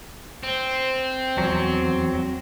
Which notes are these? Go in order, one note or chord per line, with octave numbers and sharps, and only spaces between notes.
C4
E2 F#3